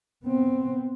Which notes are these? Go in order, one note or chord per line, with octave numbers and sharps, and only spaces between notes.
B3 C4